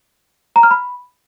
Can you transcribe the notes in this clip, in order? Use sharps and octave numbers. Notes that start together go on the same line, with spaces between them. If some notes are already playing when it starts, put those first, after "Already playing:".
A#5
F6
B5